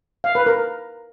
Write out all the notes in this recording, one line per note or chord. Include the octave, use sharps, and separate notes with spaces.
F5
B4
A#4